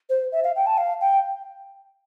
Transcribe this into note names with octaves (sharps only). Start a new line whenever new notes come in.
C5
E5
F5
G5
A5
F5
G5